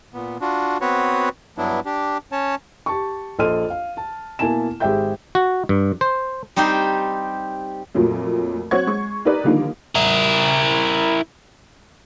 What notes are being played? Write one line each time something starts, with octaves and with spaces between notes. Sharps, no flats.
A#2 B3
D4 F4 F#4
B3 C4 F#4 B4 C#5
G2 F#3 B3 D4 E4
D4 G4
C#4 C#5 A5
G4 A5 C#6
A#1 A4 D#5 C6 F6 D#7
F5
A5
B2 A#3 E4 G#5 A5 E7
G#1 G4 G#4 E5 G5 G6
F#4
G2
C5
G3 C4 D#4 G4 C5
F2 A#2 F#3 A3
F#3 C4 C#5 F#5 C#6 G#6
G#3 C#6
D#4 G4 A#4 B4 D5
D3 D#3 F3 G3 A#3 D#4
E4 A#4